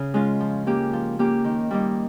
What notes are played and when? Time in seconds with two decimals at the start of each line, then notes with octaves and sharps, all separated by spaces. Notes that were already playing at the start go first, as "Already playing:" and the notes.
Already playing: C#3
0.14 G#3 C#4 F4
0.40 F3
0.66 A#3 C#4 G4
0.93 F3
1.19 A#3 C#4 G4
1.44 D#3
1.71 G3 A#3 D#4